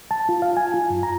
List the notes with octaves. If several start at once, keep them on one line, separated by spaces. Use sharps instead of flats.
A5
F4
F5
G#5
F4
F#2
A#5